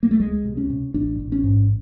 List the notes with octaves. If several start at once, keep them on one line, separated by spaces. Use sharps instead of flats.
A#3
A3
C#2 G#3
C3
C#4
C3
A1 D4
A1
C#4
G#2